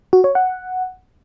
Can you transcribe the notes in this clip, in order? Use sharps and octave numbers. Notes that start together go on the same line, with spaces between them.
F#4
C#5
F#5